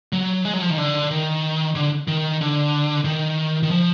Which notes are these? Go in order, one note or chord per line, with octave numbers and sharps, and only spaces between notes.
F#3
G#3
F#3
F3
D#3
D3
D#3
D3
D#3
D3
D#3
D#3
F3